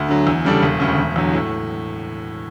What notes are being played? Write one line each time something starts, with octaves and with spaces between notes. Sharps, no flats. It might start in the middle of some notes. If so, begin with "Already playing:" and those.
Already playing: D2
D3 F#3
E2
C#3 G3 D4 A4
E1
D2 C#3
E1
E2 D3 F#3
A2